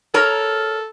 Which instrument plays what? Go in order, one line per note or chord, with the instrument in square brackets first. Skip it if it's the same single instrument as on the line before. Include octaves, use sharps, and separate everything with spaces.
[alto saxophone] A4 [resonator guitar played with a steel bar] A#4 C#5 A#5